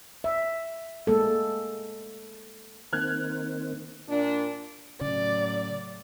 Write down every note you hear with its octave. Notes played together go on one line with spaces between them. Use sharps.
E5
G#3 A#3 A4
D#3 A#3 C4 F6 F#6 G#6
A#2 D4
A2 C#3 F#3 D5